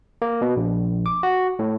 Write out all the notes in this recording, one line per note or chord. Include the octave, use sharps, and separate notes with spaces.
A#3
B2
A#1
D6
F#4
A2